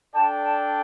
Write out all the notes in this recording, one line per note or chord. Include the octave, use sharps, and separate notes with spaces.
D4 A4 D5 G5 A5
A5